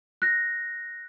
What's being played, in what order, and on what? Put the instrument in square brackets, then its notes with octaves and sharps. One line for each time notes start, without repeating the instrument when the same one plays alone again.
[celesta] F#6 A#6